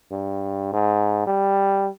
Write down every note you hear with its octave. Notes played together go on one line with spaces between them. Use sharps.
G2
G#2
G3